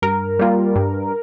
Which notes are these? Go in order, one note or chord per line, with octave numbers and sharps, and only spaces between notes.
G2 A#4
G3 A#3 F4
G2